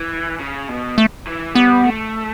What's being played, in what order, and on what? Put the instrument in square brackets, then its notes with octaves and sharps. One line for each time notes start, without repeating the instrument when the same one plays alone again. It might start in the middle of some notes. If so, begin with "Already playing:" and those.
Already playing: [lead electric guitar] E3
C#3
B2
[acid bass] A3
[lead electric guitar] E3
[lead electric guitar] G3 [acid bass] B3
[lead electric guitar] A3